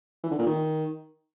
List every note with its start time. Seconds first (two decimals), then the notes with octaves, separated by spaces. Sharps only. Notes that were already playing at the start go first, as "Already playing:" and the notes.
0.24 E3
0.31 D3
0.39 A#2
0.46 D#3